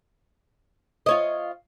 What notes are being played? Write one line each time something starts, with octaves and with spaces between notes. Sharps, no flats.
F4 C#5 D#5